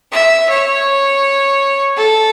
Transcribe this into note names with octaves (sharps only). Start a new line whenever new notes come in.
E5
C#5
A4